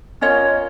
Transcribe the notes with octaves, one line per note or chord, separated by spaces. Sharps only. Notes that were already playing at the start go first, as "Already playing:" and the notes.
C#4 F4 A#4 C#5 D#5